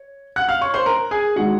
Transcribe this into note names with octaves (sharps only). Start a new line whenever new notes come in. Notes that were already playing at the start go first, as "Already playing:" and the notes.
Already playing: C#5
F#5 F#6
F5 F6
C#5 C#6
C5 C6
A#4 A#5
G#4 G#5
D#3 G#3 F#4 F#5